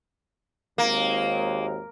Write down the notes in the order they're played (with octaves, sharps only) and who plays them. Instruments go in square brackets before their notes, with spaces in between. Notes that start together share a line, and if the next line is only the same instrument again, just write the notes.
[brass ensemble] G#1 D#2 [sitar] A#3